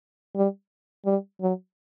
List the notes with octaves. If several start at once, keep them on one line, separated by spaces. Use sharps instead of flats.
G3
G3
F#3